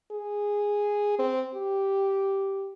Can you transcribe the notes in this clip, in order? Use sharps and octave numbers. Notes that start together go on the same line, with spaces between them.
G#4
C4
G4